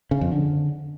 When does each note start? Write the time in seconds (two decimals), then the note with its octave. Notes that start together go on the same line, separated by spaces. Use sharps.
0.11 C#3
0.21 F2
0.31 D3